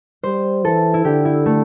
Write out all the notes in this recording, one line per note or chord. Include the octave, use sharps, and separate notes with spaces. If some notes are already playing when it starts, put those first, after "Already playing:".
G3 C5
E3 A4
E4
D3 G4
E4
A3